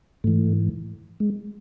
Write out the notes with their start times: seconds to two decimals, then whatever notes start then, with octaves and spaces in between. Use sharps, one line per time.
0.24 G#2 E3 A3
1.20 G#3